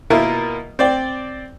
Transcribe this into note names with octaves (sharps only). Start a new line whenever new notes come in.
B2 A#3 E4 F4 A#4
C4 D5 G5